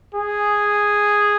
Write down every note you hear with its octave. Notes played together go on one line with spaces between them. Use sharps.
G#4